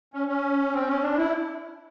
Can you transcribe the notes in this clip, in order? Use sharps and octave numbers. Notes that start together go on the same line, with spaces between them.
C#4
C#4
C4
C#4
D4
E4